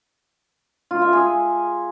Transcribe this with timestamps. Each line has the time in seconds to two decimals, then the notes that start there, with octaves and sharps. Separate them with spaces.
0.91 F4
1.02 E5
1.13 G#4